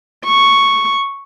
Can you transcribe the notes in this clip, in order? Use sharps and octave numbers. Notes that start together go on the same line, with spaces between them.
C#6